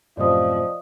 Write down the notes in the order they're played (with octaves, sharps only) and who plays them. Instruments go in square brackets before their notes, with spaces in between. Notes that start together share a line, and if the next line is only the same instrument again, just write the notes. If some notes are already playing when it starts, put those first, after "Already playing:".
[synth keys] F#2 A2 C3 [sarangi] F3 [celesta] D5 D#5 D#6